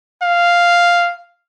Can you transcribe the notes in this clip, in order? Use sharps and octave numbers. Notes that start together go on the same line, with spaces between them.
F5